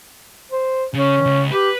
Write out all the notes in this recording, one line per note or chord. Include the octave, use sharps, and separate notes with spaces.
C5
C#3 C#4
C#2
G4 B4